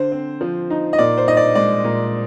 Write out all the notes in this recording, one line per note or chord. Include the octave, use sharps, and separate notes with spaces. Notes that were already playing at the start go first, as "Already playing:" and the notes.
Already playing: D3 C5
C4
F3
D#4
D#5
A#2 D5
C5
D#4 D#5
D5
G#3 D5
A#2